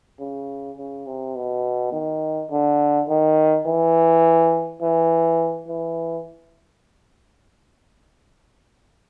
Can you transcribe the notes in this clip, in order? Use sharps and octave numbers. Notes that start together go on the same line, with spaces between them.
C#3
C#3
C3
B2
D#3
D3
D#3
E3
E3
E3